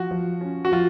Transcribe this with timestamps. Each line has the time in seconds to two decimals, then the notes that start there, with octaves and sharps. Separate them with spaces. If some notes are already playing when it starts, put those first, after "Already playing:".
Already playing: F3 F#4
0.11 F3
0.41 C#4
0.65 F#4
0.72 F3 F4